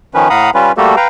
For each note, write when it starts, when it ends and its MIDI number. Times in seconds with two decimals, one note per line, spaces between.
0.14 0.29 51
0.14 0.29 53
0.14 0.29 61
0.14 0.29 71
0.30 0.50 45
0.30 0.50 77
0.30 0.50 78
0.30 0.50 82
0.30 0.50 83
0.30 0.50 87
0.54 0.72 55
0.54 0.72 61
0.54 0.72 65
0.54 0.72 71
0.77 0.95 55
0.77 0.95 57
0.77 0.95 58
0.77 0.95 66
0.77 0.95 67
0.77 0.95 69
0.96 1.08 71
0.96 1.08 77
0.96 1.08 79
0.96 1.08 82